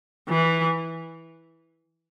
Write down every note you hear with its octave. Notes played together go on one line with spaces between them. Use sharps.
E3